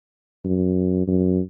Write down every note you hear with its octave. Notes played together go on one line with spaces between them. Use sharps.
F#2
F#2